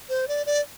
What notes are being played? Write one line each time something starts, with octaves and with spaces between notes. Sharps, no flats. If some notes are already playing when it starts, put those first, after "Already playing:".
C5
D5
D5